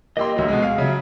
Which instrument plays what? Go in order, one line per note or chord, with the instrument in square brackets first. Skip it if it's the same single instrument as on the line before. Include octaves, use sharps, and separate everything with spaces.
[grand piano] A#3 G4 C6 [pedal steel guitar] D#5 E6
[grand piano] D2 F#3
B2 G#3
F5
[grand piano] C#3 F#3 [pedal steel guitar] E5